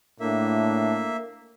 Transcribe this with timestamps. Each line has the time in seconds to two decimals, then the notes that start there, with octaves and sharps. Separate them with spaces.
0.20 A2 A#3 D4 E5